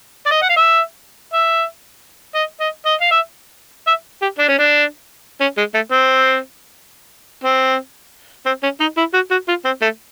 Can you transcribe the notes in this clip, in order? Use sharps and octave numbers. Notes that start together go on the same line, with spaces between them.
D5
D#5
F#5
F5
E5
E5
D#5
D#5
D#5
F5
E5
E5
G4
D4
C#4
D4
C#4
G#3
A3
C4
C4
C4
C#4
D#4
E4
F#4
F#4
F4
C4
A3